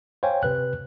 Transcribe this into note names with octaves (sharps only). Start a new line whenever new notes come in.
C5 C#5 F5 G5 G#5
C3 B4 F#6